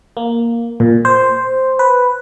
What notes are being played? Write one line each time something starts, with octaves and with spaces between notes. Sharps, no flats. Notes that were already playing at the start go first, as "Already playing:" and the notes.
A#3
A#2
C5
B4